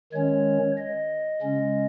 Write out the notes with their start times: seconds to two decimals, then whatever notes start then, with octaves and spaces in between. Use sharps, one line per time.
0.13 D#3 G#3 C#4 C#5
0.78 D#5
1.42 C#3 G#3 C#4